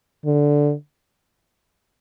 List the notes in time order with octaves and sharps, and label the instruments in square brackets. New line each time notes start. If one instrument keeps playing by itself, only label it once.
[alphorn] D3